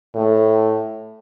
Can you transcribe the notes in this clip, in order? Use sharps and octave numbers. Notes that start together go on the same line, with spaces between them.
A2